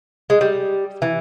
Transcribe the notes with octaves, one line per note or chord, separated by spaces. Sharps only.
G#3
G3
E3